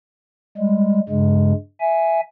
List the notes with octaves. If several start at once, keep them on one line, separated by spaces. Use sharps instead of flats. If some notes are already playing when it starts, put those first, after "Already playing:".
G3 G#3
G2 C#3 G#3
E5 G#5